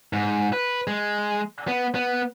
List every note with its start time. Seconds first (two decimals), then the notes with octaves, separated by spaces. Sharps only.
0.13 G#2
0.53 B4
0.87 G#3
1.68 B3
1.95 B3